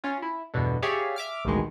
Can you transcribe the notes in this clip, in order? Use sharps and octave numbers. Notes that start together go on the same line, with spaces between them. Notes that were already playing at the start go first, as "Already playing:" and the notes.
C#4 F4
E4
E2 G2 B2 D3
G4 G#4 C#5 D5 E5 F5
E5 D6 F6
A1 D2 B2 D#3 G#3